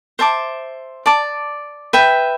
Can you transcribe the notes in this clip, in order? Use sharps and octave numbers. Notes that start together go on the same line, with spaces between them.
C5 E5 A5 D6
D5 A5 D6
B4 E5 G5